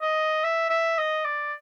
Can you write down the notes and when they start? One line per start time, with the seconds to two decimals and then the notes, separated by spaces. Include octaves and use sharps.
0.02 D#5
0.44 E5
0.70 E5
0.98 D#5
1.25 D5